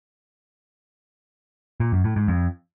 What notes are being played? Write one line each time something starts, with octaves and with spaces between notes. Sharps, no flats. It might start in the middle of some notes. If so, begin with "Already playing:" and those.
A#2
F#2
A2
G#2
F2